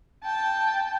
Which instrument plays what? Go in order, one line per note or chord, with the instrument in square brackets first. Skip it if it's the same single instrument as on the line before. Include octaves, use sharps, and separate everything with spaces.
[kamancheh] G5 A5